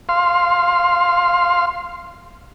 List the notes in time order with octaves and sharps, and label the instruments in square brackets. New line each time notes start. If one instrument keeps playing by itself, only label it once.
[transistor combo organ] F5 C6